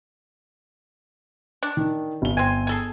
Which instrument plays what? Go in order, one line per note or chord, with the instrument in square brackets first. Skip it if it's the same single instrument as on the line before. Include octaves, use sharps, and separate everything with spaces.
[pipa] D4
[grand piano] D#3
G1 G7
[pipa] C4 G#5
G#4 A4 G#5